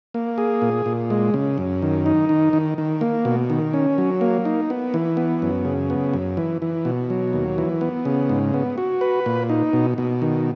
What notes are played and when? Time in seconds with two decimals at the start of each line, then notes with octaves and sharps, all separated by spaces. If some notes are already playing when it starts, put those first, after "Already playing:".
0.14 A#3
0.38 G#4
0.62 A#2
0.86 A#2
1.10 G#3
1.34 C#3
1.58 F#2
1.82 D#3
2.06 D#4
2.29 D#3
2.53 D#3
2.78 D#3
3.01 A#3
3.25 B2
3.50 D#3
3.73 C#4
3.98 F#3
4.21 A#3
4.45 D#4
4.70 B3
4.94 E3
5.17 B3
5.42 F#2
5.65 C#3
5.90 B3
6.14 F#2
6.37 E3
6.62 E3
6.85 B2
7.10 F#3
7.33 D#2
7.58 E3
7.81 B3
8.05 C#3
8.29 G#2
8.54 B3
8.78 F#4
9.01 B4
9.26 A#2
9.50 D#4
9.73 B2
9.98 B2
10.22 D#3